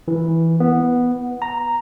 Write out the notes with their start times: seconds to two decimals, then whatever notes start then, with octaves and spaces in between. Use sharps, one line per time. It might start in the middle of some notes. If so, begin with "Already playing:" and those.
0.08 E3
0.60 B3
1.42 A#5